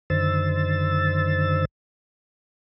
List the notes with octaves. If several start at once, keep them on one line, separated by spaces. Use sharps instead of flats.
F#2 D3 D#3 C5 E6 A6